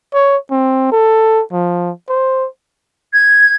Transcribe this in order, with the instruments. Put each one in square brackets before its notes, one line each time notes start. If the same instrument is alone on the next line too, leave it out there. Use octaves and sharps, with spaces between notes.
[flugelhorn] C#5
C4
A4
F3
C5
[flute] G#6